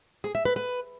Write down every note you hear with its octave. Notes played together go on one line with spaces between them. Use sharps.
G#4
E5
B4
B4